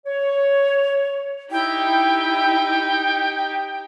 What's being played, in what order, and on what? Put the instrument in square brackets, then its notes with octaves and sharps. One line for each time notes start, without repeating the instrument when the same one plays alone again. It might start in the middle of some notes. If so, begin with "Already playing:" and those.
[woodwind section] C#5
[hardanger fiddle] D#4 G4 [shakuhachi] E4 [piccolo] G5